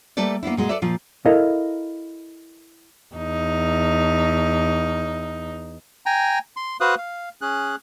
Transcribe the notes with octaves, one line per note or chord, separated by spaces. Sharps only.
G3 A3 A#3 A4 B4 D5
A#3 B3 D4 E4
A#2 G#3 F#4
A4 B4 D5 E5
A#2 F3 F4
E4 A4 A#4 D#5 F5
E2 D#4
G5 G#5 A#5
C6
F#4 B4 C5 F5 D#6 F#6
F5
C#4 G#4 F#6